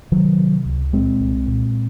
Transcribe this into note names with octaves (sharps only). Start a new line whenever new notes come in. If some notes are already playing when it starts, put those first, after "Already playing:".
C3 D#3 F#3
C3
C#2
A#2 G#3 C4
C2
A#2